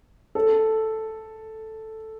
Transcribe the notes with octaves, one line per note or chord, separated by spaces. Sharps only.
A4